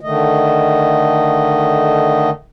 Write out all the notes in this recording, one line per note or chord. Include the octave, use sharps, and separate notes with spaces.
D3 D#3 A3 D#5